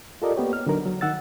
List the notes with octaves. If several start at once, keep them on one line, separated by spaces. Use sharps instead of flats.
F4 G4 A4 A#4 D5 D#5
A#3 B3 G4 C#5
F6
D3 F#3 D#4 A#4
F#3
D#3 F#5 E6 A6